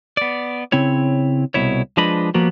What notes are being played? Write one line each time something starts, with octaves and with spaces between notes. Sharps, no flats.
B3 D5
C#3 C4 E4 C#5
C2 B2 E4 C#5
F3 G#3 D4 B4 D#5 B5
F3 G3 A#3 B3 F#4